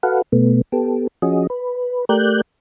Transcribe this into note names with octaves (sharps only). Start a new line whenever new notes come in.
F#4 A4 B4 F5 F#5
B2 A3 B3
B3 G4 A4
F3 C#4 F#4 G#4 D#5
B4
A3 G4 A#4 D5 F#6 G6